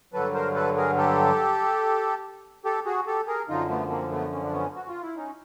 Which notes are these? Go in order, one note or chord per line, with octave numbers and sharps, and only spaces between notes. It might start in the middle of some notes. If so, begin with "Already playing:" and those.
G2 D3 F#3 A4 B4
A#4 C5
A4 B4
G#4 A#4
G4 A4
G4 A4
F#4 G#4
G4 A4
G#4 A#4
F#2 D3 F3 D#4 F4
A3 B3
A#3 C4
A3 B3
C#4
D4
B3 C#4
F#4
F4
E4
C#4 D#4